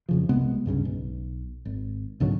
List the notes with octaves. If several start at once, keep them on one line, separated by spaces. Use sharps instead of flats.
F2 C#3 F3
C2 C3 G#3 B3
C#2 G2 C#3 C#4
B1
G#1
C2 G#2 D3 F#3